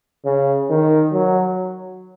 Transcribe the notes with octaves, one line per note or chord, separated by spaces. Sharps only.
C#3
D#3
F#3